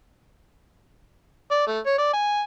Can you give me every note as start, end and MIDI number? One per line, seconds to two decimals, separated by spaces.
1.51 1.63 74
1.67 1.79 57
1.86 1.95 73
1.98 2.09 74
2.13 2.42 80